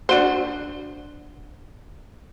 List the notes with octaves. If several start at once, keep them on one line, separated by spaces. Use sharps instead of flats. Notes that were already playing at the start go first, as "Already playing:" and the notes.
D4 F#4 C5